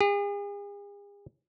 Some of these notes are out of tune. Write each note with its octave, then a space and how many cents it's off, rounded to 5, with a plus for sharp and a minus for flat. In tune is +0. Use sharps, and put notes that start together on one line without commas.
G#4 -45